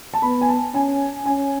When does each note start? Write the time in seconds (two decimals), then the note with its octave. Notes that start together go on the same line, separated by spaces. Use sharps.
0.14 A5
0.22 B3 B5
0.41 G#5
0.48 A5
0.74 C#4 G#5
1.25 C#4 G#5